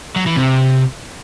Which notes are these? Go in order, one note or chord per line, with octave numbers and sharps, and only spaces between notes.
F#3
E3
C3